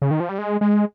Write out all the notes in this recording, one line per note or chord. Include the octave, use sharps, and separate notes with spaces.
C#3
D#3
F3
G3
G#3
G#3